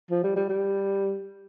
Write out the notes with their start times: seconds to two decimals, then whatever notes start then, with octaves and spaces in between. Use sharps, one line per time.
0.11 F3
0.24 G3
0.36 G3
0.49 G3